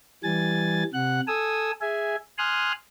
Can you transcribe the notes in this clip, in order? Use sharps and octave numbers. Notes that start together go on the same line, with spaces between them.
E3 G3 G#5 A6
C3 F#5 F#6
A4 G#5 D#6 E6
G#4 E5 G#5
G#5 C6 D#6 F6 F#6